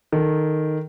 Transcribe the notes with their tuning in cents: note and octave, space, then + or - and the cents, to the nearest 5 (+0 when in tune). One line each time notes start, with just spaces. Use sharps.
D#3 +0 A4 +0